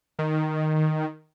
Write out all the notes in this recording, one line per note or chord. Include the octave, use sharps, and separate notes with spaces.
D#3